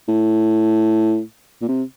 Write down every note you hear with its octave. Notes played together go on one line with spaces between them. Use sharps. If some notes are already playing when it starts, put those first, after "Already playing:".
A2
A#2
C3